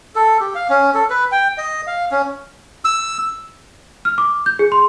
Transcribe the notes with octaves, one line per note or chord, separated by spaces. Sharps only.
A4
G4
F5
C#4
A4
B4
G5
D#5
F5
C#4
E6
F6
D6
G6
G#4
C6